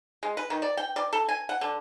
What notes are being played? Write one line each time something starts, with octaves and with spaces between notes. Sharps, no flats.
G#3
B4
D#3
D5
G5
D5
A4
G#5
F#5
D3